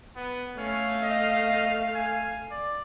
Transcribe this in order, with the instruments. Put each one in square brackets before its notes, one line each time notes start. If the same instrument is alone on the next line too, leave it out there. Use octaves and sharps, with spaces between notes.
[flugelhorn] B3
[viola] A3 F5 [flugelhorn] C#4
[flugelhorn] D#5
G#5
D5